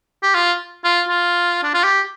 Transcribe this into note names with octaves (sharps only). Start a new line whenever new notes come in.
G4
F4
F4
F4
D4
F4
G4